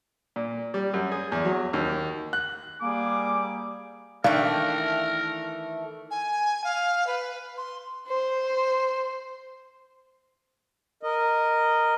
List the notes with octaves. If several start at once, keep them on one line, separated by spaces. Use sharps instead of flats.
A#2
G3
F#2
G#4
E2
F#3
D#2
F#6
G3 A#3 G#4 D6
D#3 E3 A3 D4 A#4 F5 G5
G#5
F5
B4
C6
C5
A#4 D#5